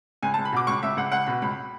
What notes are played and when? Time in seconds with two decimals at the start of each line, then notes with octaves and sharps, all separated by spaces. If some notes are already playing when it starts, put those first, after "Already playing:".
0.23 C#2 G#5
0.34 A5
0.38 C#2
0.45 B5
0.53 B2 D6
0.67 C#2 C#6
0.83 C#2 E5
0.97 C#2 F#5
1.11 C#2 F#5
1.26 B2 B5
1.42 C#2 B5